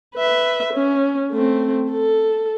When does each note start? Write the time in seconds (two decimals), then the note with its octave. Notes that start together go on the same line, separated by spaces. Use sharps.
0.15 B4 E5
0.73 C#4
1.32 A3 C4
1.91 A4